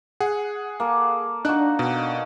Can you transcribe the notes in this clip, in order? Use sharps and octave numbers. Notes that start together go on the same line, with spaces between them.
G#4 F#5
A#3 A4
D4 D#4 F#4 F#6
B2